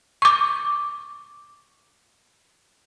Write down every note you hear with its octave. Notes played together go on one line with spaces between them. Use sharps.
C#6 D6